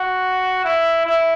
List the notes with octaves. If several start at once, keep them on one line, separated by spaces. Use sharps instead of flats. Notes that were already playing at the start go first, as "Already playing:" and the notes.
Already playing: F#4
E4
E4